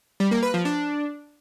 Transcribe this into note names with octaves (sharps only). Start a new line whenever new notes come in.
G3
A#3
B4
F3
D4